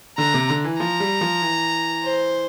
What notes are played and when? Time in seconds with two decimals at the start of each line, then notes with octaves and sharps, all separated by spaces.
0.18 D3 A#5
0.34 C3
0.49 D3
0.64 E3
0.79 F3 A#5
1.00 G3
1.21 F3
1.42 E3
2.04 C5